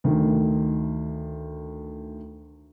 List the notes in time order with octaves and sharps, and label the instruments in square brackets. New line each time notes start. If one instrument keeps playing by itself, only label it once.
[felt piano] D2 D#3